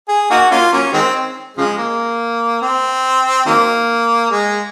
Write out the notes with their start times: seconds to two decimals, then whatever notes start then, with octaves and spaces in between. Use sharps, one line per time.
0.08 G#4
0.30 A#3 D#4 F#4
0.51 A#3 C#4 F4
0.73 F#3 A#3 C#4
0.93 D#3 G#3 C4
1.57 C#3 F3 G#3
1.78 A#3
2.62 C4
3.46 D#3 F#3 A#3
4.30 G#3